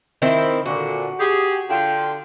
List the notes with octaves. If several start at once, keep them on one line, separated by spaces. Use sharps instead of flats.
D#3 C4 E4
A#2 D3 F#4
G4 G#4
D3 F4 G5